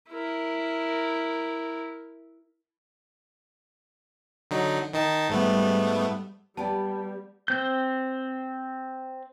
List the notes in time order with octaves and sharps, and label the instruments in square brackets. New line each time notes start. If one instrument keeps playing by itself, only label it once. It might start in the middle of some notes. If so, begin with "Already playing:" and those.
[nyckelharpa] E4 A#4
[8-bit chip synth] D3 F#3 D#4
D#3 D#4 A5
[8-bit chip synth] G#2 A3 B3 [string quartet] G3
[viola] G3 [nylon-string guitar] B3 G4 D5 [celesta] A5
[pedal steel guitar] C4 G6